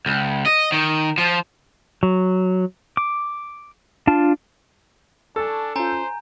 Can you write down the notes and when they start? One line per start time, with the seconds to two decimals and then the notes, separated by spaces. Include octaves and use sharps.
0.06 C#2
0.46 D#5
0.72 D#3
1.18 F3
2.03 F#3
2.97 D6
4.07 D4 F4 A5
5.36 D4 A4 G#5 A5 C#6
5.76 C#4 F4 C5 G#5 A#5 G6